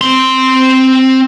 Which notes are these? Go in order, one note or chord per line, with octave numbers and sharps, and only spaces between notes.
C4 C6